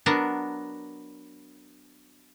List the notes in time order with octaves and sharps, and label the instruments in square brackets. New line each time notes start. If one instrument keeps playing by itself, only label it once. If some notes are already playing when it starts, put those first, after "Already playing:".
[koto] F#3 B3 D4 A#4